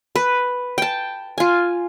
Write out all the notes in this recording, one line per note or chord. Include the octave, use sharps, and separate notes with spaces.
B4
G5 A5
F4 G#5